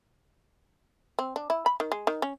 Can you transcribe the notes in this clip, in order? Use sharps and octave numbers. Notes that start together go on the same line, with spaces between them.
C4
D4
E4
B5
D#3
G#3
D#3
C#4